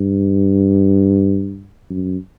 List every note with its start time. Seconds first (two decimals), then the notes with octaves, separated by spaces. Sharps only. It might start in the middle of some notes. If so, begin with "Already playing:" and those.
Already playing: G2
1.90 F#2